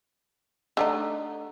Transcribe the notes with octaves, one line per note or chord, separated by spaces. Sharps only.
D3 A3 D#4